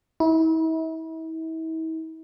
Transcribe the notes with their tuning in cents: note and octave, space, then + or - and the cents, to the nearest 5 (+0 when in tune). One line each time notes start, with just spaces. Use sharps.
E4 -40